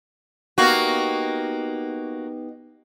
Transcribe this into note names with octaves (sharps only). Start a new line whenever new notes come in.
A#3 B3 D#4 F#4 G4